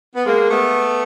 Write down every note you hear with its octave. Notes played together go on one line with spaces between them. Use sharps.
B3
G#3 A#3
A3 B3